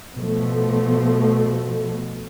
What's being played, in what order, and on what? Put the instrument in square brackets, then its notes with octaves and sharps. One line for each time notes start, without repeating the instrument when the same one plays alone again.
[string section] B2 F3 A3